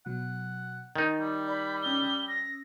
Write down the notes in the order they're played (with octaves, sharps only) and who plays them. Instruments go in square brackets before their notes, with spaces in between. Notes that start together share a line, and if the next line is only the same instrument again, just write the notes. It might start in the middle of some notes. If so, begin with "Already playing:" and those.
[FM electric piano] B2 F#3 [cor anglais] F#5
[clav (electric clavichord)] D#3 D#4 [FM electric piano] G6 A6
[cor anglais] G3
[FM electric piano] D5 G6 [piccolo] B5
[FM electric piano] C#4 D#6 E6 [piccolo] G7
[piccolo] A#6